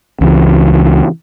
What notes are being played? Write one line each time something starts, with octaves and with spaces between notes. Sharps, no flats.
C#2 E3